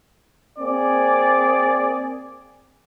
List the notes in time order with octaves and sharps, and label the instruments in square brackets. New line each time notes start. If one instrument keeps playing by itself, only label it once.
[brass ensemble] A#3 C4 G#4 D5